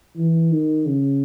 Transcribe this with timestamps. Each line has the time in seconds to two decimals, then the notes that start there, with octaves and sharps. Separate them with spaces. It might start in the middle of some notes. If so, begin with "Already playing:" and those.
0.17 E3
0.51 D#3
0.86 C#3